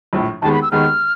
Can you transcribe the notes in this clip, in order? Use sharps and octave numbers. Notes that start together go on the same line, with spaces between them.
A#1 A2 F3
D#2 D#3 G#3 B3 A5
B5
E6
D#2 D#3 G#3 B3 F6